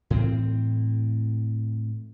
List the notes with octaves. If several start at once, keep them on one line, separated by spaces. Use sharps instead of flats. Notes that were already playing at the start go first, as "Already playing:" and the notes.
A2 E3 C4